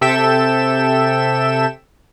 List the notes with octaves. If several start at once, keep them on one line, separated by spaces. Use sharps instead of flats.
C3 A4 E5 G5 E7